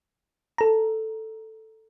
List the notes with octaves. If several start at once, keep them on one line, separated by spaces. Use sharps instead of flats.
A4 A#5